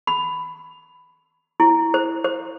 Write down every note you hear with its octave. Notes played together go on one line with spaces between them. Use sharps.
B5
E4
C5
C5